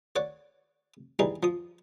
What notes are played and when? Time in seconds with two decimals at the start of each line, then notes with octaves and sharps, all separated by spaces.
0.16 C#5 D5 F#5 D6
1.19 E3 G3 D#4 G#4
1.43 F3 D#6